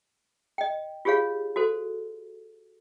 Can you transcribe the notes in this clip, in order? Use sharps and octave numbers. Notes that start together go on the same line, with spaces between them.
D#5 G5
F4 G4 G#4 C#5 F5
F#4 A4 C5